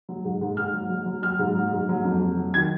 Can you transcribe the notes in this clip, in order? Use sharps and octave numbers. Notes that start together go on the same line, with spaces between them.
F#3
G#2
G#2
G#2 F6
F#3
F#3
F#3
F#3 F6
G#2
F#3
G#2
F#3
F2
F#3
F#3
D#3 G#6